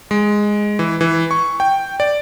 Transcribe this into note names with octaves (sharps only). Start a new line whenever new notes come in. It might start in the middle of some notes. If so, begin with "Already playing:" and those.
G#3
E3
E3
C#6
G5
D5